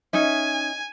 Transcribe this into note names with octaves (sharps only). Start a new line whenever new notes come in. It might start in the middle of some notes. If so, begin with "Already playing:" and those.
C#4 D#4 E5 G#5